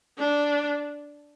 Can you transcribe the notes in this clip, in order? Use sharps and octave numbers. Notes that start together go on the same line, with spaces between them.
D4